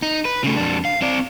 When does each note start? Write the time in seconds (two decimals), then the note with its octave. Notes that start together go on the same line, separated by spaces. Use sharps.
0.02 D#4
0.25 B4
0.44 C#3 A3
0.56 F2 D4
0.85 F5
1.02 C4 D5